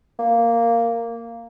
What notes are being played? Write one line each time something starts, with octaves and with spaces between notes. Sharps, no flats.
A#3